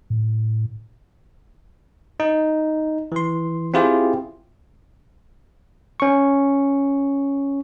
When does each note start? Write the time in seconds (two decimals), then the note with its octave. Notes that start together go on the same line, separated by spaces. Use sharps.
0.10 A2
2.20 D#4
3.12 E3 C6
3.74 C4 E4 F4 G4 G#4 C5
6.00 C#4 C#6